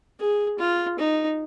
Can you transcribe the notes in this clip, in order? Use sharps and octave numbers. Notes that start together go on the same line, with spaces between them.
G#4
F4
D#4